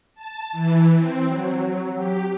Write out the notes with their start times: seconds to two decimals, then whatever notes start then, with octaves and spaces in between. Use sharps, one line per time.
0.15 A5
0.52 E3
0.97 C4
1.27 F#3
1.95 G4